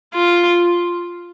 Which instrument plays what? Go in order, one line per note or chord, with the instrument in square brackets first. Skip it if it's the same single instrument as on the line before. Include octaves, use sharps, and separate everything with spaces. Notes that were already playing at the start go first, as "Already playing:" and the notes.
[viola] F4